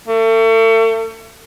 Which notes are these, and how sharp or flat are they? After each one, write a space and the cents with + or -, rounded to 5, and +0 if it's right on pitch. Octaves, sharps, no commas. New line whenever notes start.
A3 +40